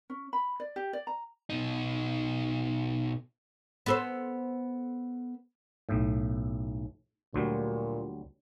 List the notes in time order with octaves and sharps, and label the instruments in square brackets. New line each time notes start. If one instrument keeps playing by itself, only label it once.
[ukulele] C#4
B5
D5
G4
D5
A#5
[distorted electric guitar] B2 D#4
[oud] B3 A4 C5
[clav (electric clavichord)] B1 A2
[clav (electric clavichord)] D2 F#3 G3 [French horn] A#2